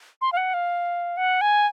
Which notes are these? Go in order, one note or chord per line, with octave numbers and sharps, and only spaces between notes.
C6
F5
F#5
F5
F#5
G#5